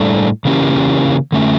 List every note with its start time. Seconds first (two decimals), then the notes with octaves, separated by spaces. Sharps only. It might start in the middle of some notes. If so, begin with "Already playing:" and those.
Already playing: A2 G3 D4 A4
0.45 C#3 E3 A#3 C#4 G4
1.32 D3 A3 C#4